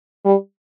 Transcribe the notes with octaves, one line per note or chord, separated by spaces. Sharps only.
G3